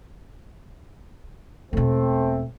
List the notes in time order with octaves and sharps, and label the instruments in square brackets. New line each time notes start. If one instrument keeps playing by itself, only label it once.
[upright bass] E1 B2 [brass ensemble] A3 C4